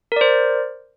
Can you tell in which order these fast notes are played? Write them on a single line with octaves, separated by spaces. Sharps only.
A#4 D5 C5